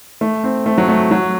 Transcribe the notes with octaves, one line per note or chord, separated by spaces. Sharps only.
A3
C4
A3
F#3
A3
F#3